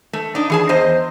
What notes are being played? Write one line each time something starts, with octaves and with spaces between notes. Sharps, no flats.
A3
D4 D#4
E3 G#4 A5
E2 C5 D#5